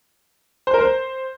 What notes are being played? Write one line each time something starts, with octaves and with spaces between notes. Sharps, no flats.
C5
A#4
C5